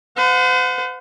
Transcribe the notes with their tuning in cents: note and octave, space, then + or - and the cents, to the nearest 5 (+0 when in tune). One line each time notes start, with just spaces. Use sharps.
C5 -45 F#5 -35